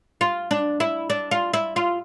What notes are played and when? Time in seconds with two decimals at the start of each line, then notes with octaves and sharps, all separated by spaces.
0.21 F4
0.51 D4
0.80 E4
1.10 D4
1.31 F4
1.53 E4
1.76 F4